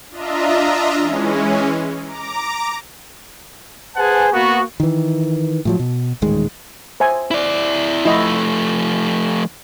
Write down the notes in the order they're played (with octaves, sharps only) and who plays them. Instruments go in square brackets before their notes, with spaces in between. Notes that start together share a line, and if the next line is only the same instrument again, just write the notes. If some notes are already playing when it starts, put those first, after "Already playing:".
[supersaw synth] D4 F4 D#5 E5 A#5
E3 G#3 C#4
A#5 D6
[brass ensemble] G#4 B4 C5 F#5 G#5 A5
A#3 B3 F#4
[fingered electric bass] D#3 E3
A2 F3 F#3
B2
D#1 A1 D#3 G#3
[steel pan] C5 E5 G#5
[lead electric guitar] E4 D5
[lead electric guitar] F3 A3 [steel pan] E4 D#5